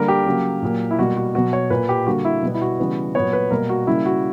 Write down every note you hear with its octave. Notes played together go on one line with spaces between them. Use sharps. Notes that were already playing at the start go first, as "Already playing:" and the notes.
Already playing: D3 G3 A#3 A#4
G4
C#3 F#3 A#3
A#2 F#3 A#3
E4
B2 G3 A#3 F#4
F#4
B2 F#3 B3 F#4
C#5
A#2 A#3 B4
G4
D3 G3 A#3 F#4
E4
B2 G3 B3
E4
F#4
C#3 E3 G3 B3
A#2 F#3 B3 C#5
B4
B2 G3 A#3 A#4
F#4
C#3 G3 A#3 E4
F#4